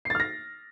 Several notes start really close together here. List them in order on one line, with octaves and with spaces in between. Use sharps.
C7 A6 F6 A#6